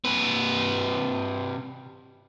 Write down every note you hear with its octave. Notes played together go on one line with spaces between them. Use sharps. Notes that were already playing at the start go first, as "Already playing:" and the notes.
C3 B4